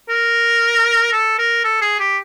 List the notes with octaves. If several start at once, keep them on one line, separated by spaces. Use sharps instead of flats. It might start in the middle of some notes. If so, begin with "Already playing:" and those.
A#4
A4
A#4
A4
G#4
G4